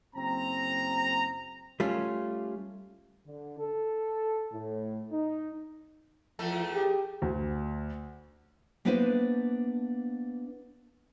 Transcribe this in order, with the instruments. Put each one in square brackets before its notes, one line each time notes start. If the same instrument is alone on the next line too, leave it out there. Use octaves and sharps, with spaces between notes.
[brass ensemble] F#1 C4 A#5
[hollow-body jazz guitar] G3 A3 C#4 F4
[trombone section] D3
A4
A2
D#4
[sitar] E2 A3 A4 [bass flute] F3
[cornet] G4 [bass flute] G#4
[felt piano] D2
[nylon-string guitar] A#3 B3 D4 E4 B4 C5